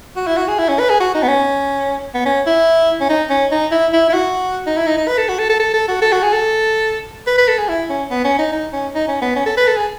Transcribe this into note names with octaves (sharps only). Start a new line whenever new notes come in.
F#4
E4
F#4
G#4
E4
C#4
B4
G#4
F#4
D#4
B3
C#4
B3
C#4
E4
C#4
D#4
C#4
D#4
E4
E4
E4
F#4
D#4
E4
D#4
D#4
B4
A4
F#4
A4
A4
A4
A4
F#4
A4
F#4
G#4
A4
B4
B4
A4
G#4
E4
C#4
B3
C#4
D#4
D#4
C#4
D#4
C#4
B3
C#4
A4
B4
A4
G#4